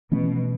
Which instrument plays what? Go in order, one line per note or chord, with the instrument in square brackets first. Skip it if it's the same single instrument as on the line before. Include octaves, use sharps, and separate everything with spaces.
[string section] B2 [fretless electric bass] E3 A3 C#4